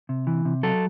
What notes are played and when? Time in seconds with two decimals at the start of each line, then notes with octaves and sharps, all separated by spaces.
0.09 C3
0.27 E3
0.45 C3
0.63 F#3 A4